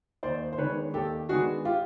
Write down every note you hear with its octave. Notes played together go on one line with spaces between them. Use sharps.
D#2 C5 D5
C5
D#3 G#3 B3 D4 B4 C#5
D#2 G4 A4
D#3 G#3 B3 D4 F#4 G#4
F4 G4